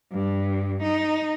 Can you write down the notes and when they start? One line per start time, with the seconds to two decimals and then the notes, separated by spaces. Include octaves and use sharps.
0.12 G2
0.83 D#4